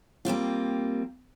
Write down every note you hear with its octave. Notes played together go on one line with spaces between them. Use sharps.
G3 A#3 C4 F4